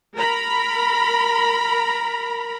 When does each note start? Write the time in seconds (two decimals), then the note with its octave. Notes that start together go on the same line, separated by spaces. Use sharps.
0.15 A#4 A#5 B5